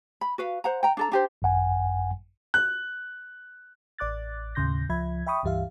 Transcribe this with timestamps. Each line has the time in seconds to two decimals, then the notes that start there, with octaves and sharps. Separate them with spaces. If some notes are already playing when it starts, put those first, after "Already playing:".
0.21 B5
0.38 F#4 B4 F5
0.64 C5 F#5 A#5
0.83 G5 A#5
0.97 D4 A4 A#5
1.12 D4 G4 C5
1.42 G#1 F#2 F#5 G#5
2.54 F#6
3.98 A1 D5 D6 F#6 A6
4.55 D#2 A2 C#3 C6 G6 A#6
4.89 C#2 F3 E5 B5 G#6
5.26 E5 G5 B5 C#6 D#6
5.43 C#2 G2 E3 G4 E5 F5